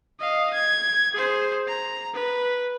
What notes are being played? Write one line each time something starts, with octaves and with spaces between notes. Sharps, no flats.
D#5 F5
G#6
G#4 C5
A#5
B4